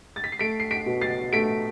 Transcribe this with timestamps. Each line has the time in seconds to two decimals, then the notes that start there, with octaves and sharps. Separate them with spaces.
0.16 A6
0.24 B6
0.32 C7
0.39 A3 B6 D7
0.60 C7
0.71 B6 D7
0.86 B2
1.01 A6 C7
1.33 A3 B6 D7